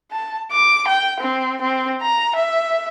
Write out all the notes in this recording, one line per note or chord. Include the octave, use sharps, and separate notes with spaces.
A5
D6
G5
C4
C4
A#5
E5